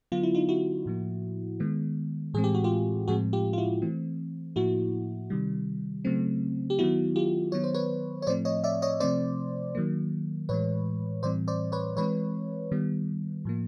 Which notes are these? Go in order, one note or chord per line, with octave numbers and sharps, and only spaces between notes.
D3 F#3 B3 F4
E4
D#4 F4
E4 F#4
A2 F3 A#3
D#3 G#3 B3
A2 E3 G#3 C4 G#4
G4
F#4
F4 G4
A2 F3 G#3 C4 F#4 G#4
F4 G4
F4
E4 F#4
E3 A3 C4
A2 F3 A#3 E4 F#4
C3 D#3 G3
C#3 F#3 A3 C4
G4
D#3 F#3 B3 E4 F#4
F4 G4
D#3 F#3 B3 C#5
C5
B4 C#5
C#5
A2 F3 A3 C4 C5 D5
C#5 D#5
D5 E5
C#5 D#5
C3 F3 A3 C4 C5 D5
D#3 F#3 A#3
A2 E3 G#3 B4 C#5
A2 E3 G3 C4 C5 D5
C5 D5
B4 C#5
E3 G#3 C4 B4 C#5
D#3 G3 B3
A2 F3 A#3